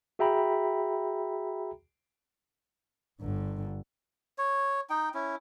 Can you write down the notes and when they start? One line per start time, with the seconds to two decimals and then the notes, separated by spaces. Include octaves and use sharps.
0.19 F#4 G#4 E5 G5 A#5 B5
3.21 G1 D3
4.38 C#5
4.90 D#4 G5
5.14 C#4 E4